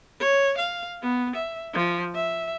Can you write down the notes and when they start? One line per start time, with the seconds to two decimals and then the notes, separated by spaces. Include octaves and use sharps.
0.20 C#5
0.58 F5
1.02 B3
1.36 E5
1.74 F3
2.15 E5